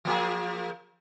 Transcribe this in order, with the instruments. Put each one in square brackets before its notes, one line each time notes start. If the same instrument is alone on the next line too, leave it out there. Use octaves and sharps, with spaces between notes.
[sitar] F3 A#3 G#4